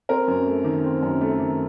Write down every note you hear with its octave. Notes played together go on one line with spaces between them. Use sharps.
C4 A#4
F#2
A3
D#3
C4
F#2
A3
D#3